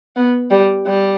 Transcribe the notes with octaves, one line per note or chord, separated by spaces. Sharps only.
B3
G3
G3